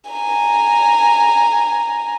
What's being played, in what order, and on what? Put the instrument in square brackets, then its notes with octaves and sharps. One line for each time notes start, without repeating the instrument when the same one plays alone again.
[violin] G#5 A#5